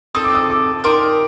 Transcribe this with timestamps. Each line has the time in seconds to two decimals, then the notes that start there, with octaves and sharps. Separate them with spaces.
0.15 C4 D#4 A4 D#6
0.25 D6
0.35 D#6
0.50 D6
0.84 D#4 G4 A#4 D5 C6